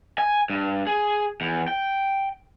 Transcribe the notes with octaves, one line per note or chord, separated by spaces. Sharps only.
G#5
G2
G#4
E2
G5